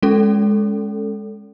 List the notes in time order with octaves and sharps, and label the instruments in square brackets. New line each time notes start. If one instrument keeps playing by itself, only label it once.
[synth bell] G#3 C#4 A4